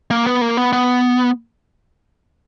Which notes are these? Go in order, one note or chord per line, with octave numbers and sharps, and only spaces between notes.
A#3
B3
A#3
B3
B3